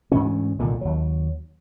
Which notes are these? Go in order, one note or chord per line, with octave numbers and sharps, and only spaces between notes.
D2 G#2 E3 C#4
C2 A#2 D3 D#3
D#2 F#3